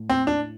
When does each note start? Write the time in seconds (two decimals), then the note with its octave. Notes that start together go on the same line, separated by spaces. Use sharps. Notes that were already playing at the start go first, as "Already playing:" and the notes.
Already playing: A2
0.10 C4
0.27 D4